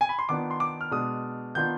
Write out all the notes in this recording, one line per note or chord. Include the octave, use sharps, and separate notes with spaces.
G#5
B5
C6
D#3 B3 D4 F4 D6
C6
D6
F6
B2 G#3 D4 D#6
D#3 B3 D4 F4 G6